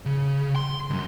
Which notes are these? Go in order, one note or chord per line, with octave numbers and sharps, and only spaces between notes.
C#3
C6
C#2 F#2